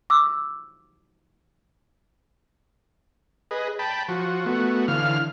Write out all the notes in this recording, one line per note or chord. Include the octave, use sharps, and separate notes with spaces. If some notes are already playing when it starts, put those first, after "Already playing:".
D6 E6
G#4 B4 D#5
G5 A5 B5
F3 F#4
A3 B3 F#4
D3 E3 F5 F6